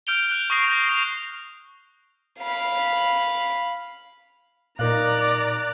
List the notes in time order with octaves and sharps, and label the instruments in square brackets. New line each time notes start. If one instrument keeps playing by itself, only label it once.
[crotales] F6 G6 D7 F7 G7
F#6 F7
C#6 D#6 A#6 C7 D7
G6 A#6
C7 F7
[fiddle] F5 B5
[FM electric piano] A#2 [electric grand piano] D#4 A#4 F5 [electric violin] D5 A#5 [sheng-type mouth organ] F#6